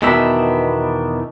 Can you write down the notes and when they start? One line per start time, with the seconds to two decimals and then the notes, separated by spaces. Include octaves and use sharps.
0.02 E2 B2 D#3 D4 E5